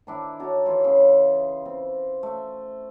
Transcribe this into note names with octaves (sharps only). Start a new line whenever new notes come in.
D#3 D4 E4
D#4 F#4 A4 C#5
E3 E4 F4 C#5
C#3
C4
A3